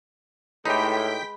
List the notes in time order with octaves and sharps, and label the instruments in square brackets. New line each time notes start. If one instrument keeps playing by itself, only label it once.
[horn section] A2 [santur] G#3 B4 [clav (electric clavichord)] D#4 G4 [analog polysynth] G5 B6